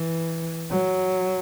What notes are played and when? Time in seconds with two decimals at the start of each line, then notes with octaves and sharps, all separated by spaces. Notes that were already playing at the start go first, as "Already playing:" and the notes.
Already playing: E3
0.70 F#3